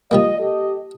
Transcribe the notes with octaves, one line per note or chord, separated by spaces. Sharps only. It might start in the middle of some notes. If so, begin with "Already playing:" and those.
F3 G3 A#3 D#5
G4 A4 D#5